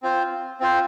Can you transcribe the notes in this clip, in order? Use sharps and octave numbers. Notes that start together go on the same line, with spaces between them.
C4 F4 C5
C4 F4 C5